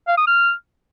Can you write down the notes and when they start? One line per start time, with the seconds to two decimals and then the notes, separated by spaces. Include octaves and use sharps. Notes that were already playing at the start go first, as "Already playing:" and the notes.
0.08 F5
0.18 D#6
0.27 F6